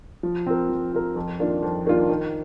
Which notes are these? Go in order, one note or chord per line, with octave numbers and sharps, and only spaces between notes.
F3
C4 F4 A#4
F3
C4 F4 A#4
F2
D#3 A#3 D4 F4
F2
D#3 A#3 D4 F4
D#3